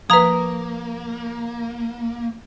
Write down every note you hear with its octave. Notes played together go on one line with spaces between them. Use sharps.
F3 A#3 B4 A#5 D#6